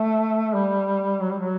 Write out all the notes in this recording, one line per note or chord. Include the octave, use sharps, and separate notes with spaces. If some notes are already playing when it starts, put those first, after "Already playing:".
Already playing: A3
G3
F#3
G3
F#3